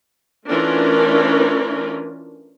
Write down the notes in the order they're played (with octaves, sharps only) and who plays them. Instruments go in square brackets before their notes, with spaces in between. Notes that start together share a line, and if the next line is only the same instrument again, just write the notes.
[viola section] E3 A3 C#4 D4 F4 A#4